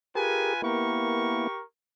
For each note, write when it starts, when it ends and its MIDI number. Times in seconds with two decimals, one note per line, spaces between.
0.15 0.61 65
0.15 0.54 67
0.15 0.54 68
0.15 0.54 70
0.15 0.61 71
0.15 0.61 80
0.62 1.47 58
0.62 1.47 59
0.62 1.47 64
0.62 1.62 67
0.62 1.62 70
0.62 1.62 85